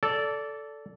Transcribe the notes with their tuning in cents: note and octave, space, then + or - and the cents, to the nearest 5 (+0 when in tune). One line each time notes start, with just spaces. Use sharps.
A4 +0 D5 -20